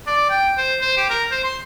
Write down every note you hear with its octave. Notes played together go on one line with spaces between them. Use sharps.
D5
G5
C5
C5
G4
A#4
C5
C6